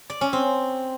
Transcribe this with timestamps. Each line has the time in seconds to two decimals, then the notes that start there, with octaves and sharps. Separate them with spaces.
0.10 D5
0.21 C#4
0.33 C4